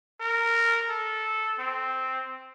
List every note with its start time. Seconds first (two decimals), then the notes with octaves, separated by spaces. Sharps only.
0.21 A#4
0.90 A4
1.59 C4